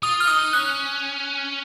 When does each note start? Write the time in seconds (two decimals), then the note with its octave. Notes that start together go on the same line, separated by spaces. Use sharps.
0.03 F4 D#6
0.20 F6
0.27 D#4 D#6
0.53 C#4 F#6